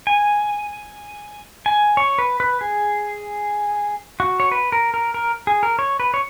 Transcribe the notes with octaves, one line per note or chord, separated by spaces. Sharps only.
G#5
G#5
C#5
B4
B4
G#4
F#4
C#5
B4
A#4
A#4
A#4
G#4
A#4
C#5
B4
C#5